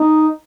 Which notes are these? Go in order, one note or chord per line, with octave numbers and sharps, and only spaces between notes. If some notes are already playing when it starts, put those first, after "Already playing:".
Already playing: D#4